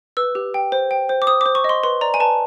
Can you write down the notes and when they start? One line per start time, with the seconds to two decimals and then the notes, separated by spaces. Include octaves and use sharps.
0.17 B4 E6
0.35 G4
0.54 G5
0.72 C5
0.91 G5
1.09 C5
1.22 D6
1.27 C5 D#6
1.41 D6
1.46 C5
1.55 C#6
1.64 D#5
1.69 C6
1.83 B4 C6
2.01 D5 A#5
2.14 G#5
2.20 B4 A5